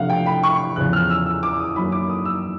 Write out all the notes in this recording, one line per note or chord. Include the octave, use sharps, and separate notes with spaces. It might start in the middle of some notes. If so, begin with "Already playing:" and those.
Already playing: C3 F3 A3 D4 F5 F#5
G5
B5
C#6
E2 C#3 F3 F#6
F6
E6
E6
D6
D#6
F#2 D#3 F#3 A#3 B5
D6
D#6
E6